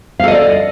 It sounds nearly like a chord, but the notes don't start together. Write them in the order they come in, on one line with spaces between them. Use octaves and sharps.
F5 A4 D#5 D5